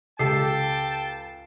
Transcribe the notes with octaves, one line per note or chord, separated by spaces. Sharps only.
C#2 G4 A4 G5 A5 C7